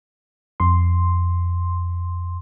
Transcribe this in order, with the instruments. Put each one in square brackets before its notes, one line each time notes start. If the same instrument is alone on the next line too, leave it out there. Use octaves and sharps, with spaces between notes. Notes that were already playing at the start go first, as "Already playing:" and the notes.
[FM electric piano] F2 C6